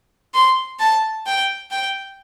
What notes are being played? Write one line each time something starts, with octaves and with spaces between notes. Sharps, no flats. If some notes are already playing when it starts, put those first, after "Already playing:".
C6
A5
G5
G5